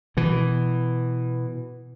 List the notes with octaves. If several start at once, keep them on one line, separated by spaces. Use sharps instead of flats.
B2 E3